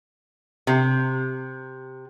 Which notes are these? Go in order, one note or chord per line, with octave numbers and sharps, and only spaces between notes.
C3